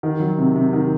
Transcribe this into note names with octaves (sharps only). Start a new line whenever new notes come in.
D#3
F#3
C3
C3
D#3